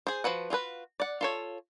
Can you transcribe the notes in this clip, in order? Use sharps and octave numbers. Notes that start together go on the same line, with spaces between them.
G#4 C5
F3 F#4 B4 F#5
F4 F#4 G#4 B4
D5 F#5
F4 A4 C#5